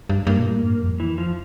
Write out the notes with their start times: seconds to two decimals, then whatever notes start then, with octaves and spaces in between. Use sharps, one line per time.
0.09 G2
0.27 G2 A#3
0.39 A#2
0.45 A2
0.64 G2
0.81 F2
1.00 E3
1.18 F3